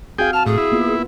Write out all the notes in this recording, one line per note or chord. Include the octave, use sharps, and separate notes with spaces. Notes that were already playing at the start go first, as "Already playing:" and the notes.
C4 F#4 G#4 F5 G5
A5 F6
A2 G#4
E4
A#3 B3 F4